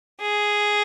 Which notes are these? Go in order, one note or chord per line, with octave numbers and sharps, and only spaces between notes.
G#4